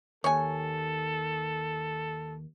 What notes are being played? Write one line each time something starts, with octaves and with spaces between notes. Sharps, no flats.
D#2 A4 C#5 G#5